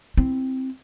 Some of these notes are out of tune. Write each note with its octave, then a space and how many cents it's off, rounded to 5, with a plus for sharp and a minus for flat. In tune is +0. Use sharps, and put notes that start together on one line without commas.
C4 +0 E4 +0